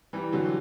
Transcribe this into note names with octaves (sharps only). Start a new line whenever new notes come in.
E3 G3
D3 F#3